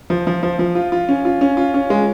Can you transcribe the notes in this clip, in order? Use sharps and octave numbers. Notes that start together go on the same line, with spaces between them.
F3
F3
F3
F3
F4
F4
C#4
F4
C#4
F4
C#4
G#3